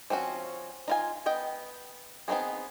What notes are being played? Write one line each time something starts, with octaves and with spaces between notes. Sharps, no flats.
F3 C4 C#4 F#4
D#4 F4 G#5
B3 D#5 G5
B3 C4 D#4 F#4 G#4